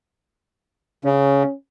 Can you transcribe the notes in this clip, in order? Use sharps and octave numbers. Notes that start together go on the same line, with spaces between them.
C#3 C#4